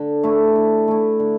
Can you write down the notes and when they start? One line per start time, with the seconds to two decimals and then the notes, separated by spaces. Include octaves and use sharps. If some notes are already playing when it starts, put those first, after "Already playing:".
Already playing: D3
0.24 A3 E4
0.56 D3
0.88 A3 E4
1.20 D3